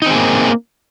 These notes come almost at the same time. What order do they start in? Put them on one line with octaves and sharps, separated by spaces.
D#4 C4 G#4 A#3